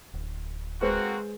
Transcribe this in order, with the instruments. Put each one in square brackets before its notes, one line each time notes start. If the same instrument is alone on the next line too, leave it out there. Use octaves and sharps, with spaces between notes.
[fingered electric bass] D1
[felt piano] G#3 C5 [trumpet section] A#3 C4 F#4 [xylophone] B4